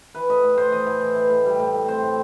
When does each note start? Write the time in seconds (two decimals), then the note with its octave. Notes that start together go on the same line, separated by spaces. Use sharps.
0.15 E3 B4
0.30 A2 D#5
0.44 A2
0.57 A2 C5
0.72 E3 D#5
0.86 A2
1.01 E3
1.16 E3
1.30 A2
1.46 G3
1.59 A2
1.74 A2
1.88 C4 C5
2.03 A2